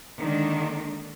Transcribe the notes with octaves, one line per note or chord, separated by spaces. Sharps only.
D3 D#3 G#3 A#3 D4 D#4